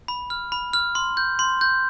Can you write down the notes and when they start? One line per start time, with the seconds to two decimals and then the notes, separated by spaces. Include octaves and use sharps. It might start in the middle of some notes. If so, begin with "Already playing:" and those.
0.08 B5
0.30 F6
0.52 B5
0.73 F6
0.95 C6
1.17 G6
1.39 C6
1.61 G6